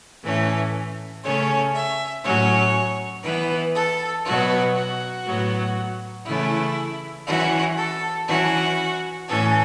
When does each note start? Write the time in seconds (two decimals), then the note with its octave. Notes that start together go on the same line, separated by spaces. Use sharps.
0.24 A2 E3 A3 C#4
1.24 C#3 A3 C#4 C#5
1.74 E5
2.24 A2 F#3 C#4 C#5
3.24 E3 B3 B4
3.75 A4
4.26 B2 F#3 B3 F#4
4.76 F#4
5.26 A2 F#3 B3
6.26 C#3 E3 A3 C#4 E4
7.27 E3 C#4 F#4
7.78 A4
8.28 E3 C#4 F#4
9.29 A2 E3 C#4 A4